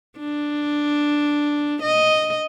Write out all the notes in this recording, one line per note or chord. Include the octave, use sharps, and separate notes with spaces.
D4
D#5